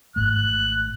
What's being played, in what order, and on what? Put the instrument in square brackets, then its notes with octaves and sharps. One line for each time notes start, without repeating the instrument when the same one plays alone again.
[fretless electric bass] G#1 G#2 A3 [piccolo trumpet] F#6